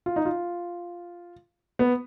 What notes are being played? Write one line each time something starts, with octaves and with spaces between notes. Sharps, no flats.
F4
D#4
F4
B3